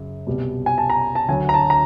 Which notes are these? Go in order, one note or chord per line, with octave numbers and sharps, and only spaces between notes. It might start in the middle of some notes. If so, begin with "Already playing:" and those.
Already playing: F#2 C#3
C2 B2 G3
G#5
A5
A#5
A5
D2 D3 F#3 G#5
A#5
A5
A#5